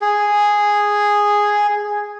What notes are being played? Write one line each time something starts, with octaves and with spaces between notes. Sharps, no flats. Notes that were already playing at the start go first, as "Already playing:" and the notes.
G#4